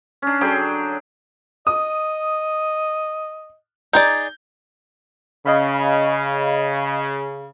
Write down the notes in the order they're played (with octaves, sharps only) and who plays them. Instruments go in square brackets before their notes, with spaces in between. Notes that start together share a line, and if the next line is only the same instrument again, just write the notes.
[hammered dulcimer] C#4 D4
D3 F#3 G#4 G5
[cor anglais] D#5 [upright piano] D#6
[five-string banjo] D#4 G#4 D5 [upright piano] G6
[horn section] C#3 [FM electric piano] D#5 F5 B5